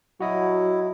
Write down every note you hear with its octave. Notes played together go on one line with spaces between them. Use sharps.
F#3 E4 F#4 D#5